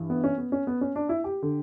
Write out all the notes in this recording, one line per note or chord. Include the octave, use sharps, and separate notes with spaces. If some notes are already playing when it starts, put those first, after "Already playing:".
Already playing: G2 E3
B3
C#4
B3
C#4
B3
C#4
D4
E4
G4
D3